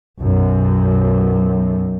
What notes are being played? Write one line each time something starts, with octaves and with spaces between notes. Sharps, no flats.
B1 F#2